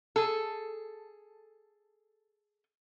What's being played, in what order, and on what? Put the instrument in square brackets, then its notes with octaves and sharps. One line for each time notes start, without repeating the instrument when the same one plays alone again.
[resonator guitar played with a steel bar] G#4 A4